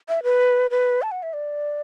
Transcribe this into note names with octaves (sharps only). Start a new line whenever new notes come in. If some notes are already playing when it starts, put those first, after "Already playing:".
E5
B4
B4
A5
F#5
E5
D5